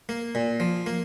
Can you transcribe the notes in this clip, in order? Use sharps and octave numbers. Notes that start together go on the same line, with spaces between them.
A#3
A#2
F3
A#3